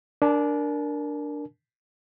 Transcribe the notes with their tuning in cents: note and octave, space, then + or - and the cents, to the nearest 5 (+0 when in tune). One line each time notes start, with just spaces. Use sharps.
D4 +0 A#4 +0 G#5 +45